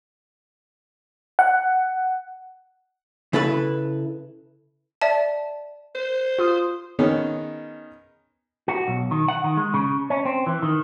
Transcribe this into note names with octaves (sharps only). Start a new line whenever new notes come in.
F#5
C#3 E4 A4 B4
D5 E5 A5
C5
F4 C6 D#6
D#3 B3 C#4 D#4 G#4
F#4
B1
D#3
F#5
D#3
G#3
C#3
C#4
C4
E3
D#3